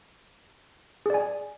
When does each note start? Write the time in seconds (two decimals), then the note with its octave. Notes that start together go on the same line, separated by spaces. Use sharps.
1.06 G#4
1.10 D5
1.14 G#5